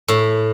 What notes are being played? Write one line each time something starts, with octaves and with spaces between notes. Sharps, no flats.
A2